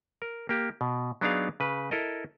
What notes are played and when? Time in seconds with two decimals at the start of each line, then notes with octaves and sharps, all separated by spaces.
0.22 A#4
0.49 A#3 G4
0.81 B2
1.21 F#3 B3 D4 D#4 G#4 F5
1.60 C#3 B4
1.91 E4 A4 A#4 D#5